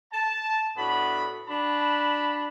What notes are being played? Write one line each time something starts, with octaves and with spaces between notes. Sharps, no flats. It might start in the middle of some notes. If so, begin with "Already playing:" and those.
A5
A2 A3 B3 D4 F#4 B5
D4 F#4 A5 B5